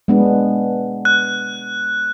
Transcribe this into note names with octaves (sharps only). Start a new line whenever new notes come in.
G#3 B3 D4
F#6